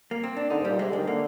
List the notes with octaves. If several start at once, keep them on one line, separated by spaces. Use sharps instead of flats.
A#3
C4
D4
D3 D#4
G#2
A#2 G3
C3 G#3
D3
D#3 G#3
D3 A#3